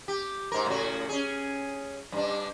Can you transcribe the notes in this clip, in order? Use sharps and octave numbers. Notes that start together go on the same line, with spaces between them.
G4
G#2 A#4
A2 C#3 F#4
C#4 G#4
G2 D4